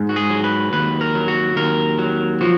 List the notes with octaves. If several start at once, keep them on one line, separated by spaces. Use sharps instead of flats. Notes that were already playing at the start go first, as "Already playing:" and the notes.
Already playing: G#2
F#4
G#4
F#3
B4
D#2 B4
A#4
F#3
F#4
D#2 A#4
F#3
F3 F#4